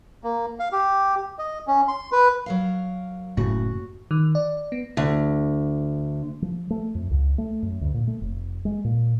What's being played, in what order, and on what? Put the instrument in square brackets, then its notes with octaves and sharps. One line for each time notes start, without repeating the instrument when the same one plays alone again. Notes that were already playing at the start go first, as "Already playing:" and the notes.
[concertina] A#3
F5
G4
D#5
C#4
C6
B4
[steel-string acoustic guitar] F#3 A#4 F5
[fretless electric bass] F#1 A2 C#3 [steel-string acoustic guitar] F#4
[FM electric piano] D#3
D5
B3
[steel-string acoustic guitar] D2
[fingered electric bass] F3
A3
F2
C#2
A3
F#2
D2
A#2
A3
F1
G#3
A#2